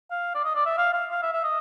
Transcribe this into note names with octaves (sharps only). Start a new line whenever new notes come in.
F5
D5
D#5
D5
E5
F5
F5
F5
E5
E5
D#5